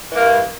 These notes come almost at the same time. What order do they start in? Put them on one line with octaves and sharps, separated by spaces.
E3 A#3 G2